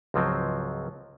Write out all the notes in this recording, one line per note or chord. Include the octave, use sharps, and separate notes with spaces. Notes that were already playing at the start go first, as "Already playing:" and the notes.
C#2 G#2 F3 F#3 C4